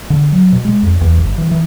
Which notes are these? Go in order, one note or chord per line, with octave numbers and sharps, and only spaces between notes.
D3
F#3
B2
G#3
F2
E2
G1
E3
E3